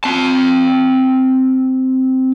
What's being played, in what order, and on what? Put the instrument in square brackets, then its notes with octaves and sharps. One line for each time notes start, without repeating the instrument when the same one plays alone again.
[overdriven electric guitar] C4 A5